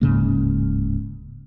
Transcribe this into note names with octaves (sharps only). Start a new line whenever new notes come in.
D1 G#2 C#3 A#3